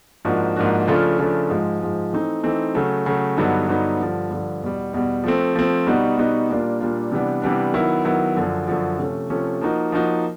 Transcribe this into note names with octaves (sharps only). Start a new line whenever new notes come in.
G#2 F3 A#3 D4 F#4
G#2 F3 A#3 D4 F#4
C#3 F3 A3 D4 F4
C#3 F3 A3 D4 F4
G#2 F3 G#3
G#2 F3 G#3
E3 A3 C4 D#4
E3 A3 C4 D#4
C#3 F#3 A3
C#3 F#3 A3
G2 D3 F#3 B3 D#4
G2 D3 F#3 B3 D#4
G2 D3 F3
G2 D3 F3
E2 B2 G3
E2 B2 G3
F3 A3 C4
F3 A3 C4
B2 G3 B3 D#4 F#4
B2 G3 B3 D#4 F#4
A#2 G3 A#3 D4 F4
A#2 G3 A#3 D4 F4
C3 E3 G3 B3 D4
C3 E3 G3 B3 D4
D#3 F#3 B3 E4
D#3 F#3 B3 E4
F#2 D3 F3
F#2 D3 F3
C3 F3 A3 C#4
C3 F3 A3 C#4
F3 A#3 D#4 F#4
F3 A#3 D#4 F#4